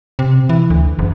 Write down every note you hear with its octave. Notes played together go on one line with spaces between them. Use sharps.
C3
E3
D2
F#1